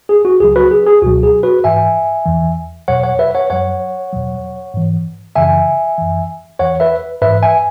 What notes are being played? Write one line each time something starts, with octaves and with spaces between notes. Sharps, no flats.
G#4
F#4
C#2 C#3 F#3 G#4
F#4 B4
G#4
G#4
C#2 B2 F#3 F#4
G#4
F#4 B4
G#2 E3 E5 G#5
E2 E3
E2 B2 F#3 C#5 F#5
C#5 F#5
B4 E5
C#5 F#5
F#2 F#3 C#5 F#5
E2 B2 F#3
G#2 E3
F#2 C#3 E3 E5 G#5
F#2 E3
E2 E3 C#5 F#5
B4 E5
G#2 E3 B4 E5
E5 G#5